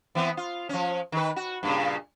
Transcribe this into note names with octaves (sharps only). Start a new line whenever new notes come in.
E3 B3 C4
F4
F3 C#4
D#3 B4
F#4
G2 A#2 C#3